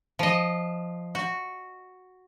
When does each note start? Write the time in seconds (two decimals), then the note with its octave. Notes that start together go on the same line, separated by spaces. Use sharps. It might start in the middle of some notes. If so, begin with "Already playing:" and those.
0.19 F3 D#5
1.15 F#4